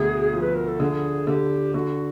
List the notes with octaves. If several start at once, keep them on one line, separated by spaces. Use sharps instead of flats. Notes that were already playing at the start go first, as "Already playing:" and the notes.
Already playing: D2 B2 G#4
F3
B4
A#4
A4
D3 G#4
D3 G4
D3 F#4